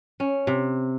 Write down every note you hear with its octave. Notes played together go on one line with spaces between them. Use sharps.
C#4
C3